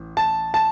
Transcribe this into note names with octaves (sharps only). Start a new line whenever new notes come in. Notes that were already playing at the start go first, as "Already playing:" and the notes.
Already playing: A1
A5
A5